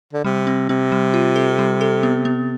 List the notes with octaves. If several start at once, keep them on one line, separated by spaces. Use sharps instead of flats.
D3
C3 G3
C4
C3 C4
G3
F4
A4
G3
A4
B3
B3